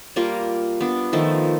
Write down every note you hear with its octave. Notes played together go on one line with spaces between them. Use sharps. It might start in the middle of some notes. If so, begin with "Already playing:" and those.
G3 A#3 F4 A#4
B3 D4
D#3 F3 A3